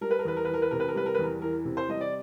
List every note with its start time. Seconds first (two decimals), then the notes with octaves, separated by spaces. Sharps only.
0.01 G3 A#4
0.11 B4
0.19 A#4
0.25 E2 B4
0.36 A#4
0.45 B4
0.49 E3
0.54 A#4
0.62 B4
0.71 C3 A#4
0.80 B4
0.88 A#4
0.95 G3 B4
1.06 A#4
1.14 B4
1.19 E2 A#4
1.41 E3 A#4
1.65 C3
1.77 C5
1.88 G3 D#5
2.01 D5